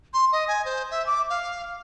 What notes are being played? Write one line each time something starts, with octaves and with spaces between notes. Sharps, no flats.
C6
D#5
G#5
C5
E5
D6
F5